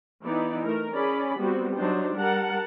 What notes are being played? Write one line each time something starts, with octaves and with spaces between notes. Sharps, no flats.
E3 B3 D#4 E4 D5
A3 A#4
C#4 G#4 D5 B5
G3 B3 C4 F#4
F#3 D4 D#4 C5
G3 A#4 F#5 A5